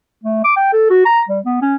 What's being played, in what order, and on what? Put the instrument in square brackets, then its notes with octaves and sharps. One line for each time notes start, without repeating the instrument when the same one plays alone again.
[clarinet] A3
D6
G5
A4
F#4
A#5
G3
B3
C#4